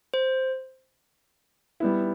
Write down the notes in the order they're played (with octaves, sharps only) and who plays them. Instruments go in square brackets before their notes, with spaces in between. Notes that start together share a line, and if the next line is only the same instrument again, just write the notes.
[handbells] C5
[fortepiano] G3 B3 E4